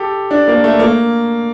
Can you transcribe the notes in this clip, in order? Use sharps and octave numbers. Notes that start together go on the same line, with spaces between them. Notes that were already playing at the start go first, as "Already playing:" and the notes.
Already playing: G4 A4
D4
A#3
A3
A#3